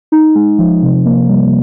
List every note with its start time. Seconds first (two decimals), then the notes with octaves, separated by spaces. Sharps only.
0.12 D#4
0.35 G#3
0.58 F3
0.82 C3
1.05 A#3
1.29 G3